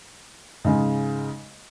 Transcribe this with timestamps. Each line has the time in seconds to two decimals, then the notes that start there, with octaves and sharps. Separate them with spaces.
0.64 G#2 C#3 G#3